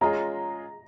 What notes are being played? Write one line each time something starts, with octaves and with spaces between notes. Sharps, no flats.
G#3 C#4 F4 G#4 D#5 A#5